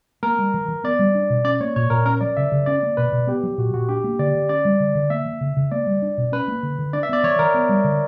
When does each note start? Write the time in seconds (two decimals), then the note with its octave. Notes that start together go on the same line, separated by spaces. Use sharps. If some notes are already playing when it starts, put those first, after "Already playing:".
0.23 A#3 A#4
0.39 G3
0.54 E3
0.68 E3
0.84 B3 D5
0.99 G3
1.15 D4
1.30 B2
1.44 C#4 D5
1.60 A#3 C#5
1.76 A#2 C#5
1.90 A#2 A#4
2.06 C#4 A#4
2.21 F#3 D5
2.37 C#3 E5
2.52 C#3
2.66 C#4 D5
2.83 A#3
2.97 B2 B4
3.12 B2
3.27 B3 G4
3.43 F#3
3.58 A#2 F#4
3.74 A#2 F#4
3.89 D4 G4
4.04 A#3
4.19 D3 D5
4.35 D3
4.49 C#4 D5
4.65 G3
4.80 D3
4.95 D3
5.10 A#3 E5
5.25 E3
5.41 C#3
5.57 C#3
5.72 A#3 D5
5.87 G3
6.02 D4
6.18 B2
6.32 C#4 B4
6.48 A#3
6.63 D3
6.78 D3
6.93 D4 D5
7.03 E5
7.09 B3 D5
7.23 E3 C#5
7.39 E3 A#4
7.54 B3
7.69 G3
7.84 D3